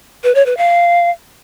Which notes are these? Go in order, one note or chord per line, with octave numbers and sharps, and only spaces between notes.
B4
C#5
B4
F5